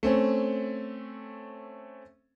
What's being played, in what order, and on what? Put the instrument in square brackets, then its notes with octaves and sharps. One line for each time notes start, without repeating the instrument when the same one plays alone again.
[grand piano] A3 C4 C#4